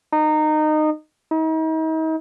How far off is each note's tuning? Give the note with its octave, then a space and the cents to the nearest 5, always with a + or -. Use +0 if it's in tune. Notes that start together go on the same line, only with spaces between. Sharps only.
D#4 -20
D#4 +40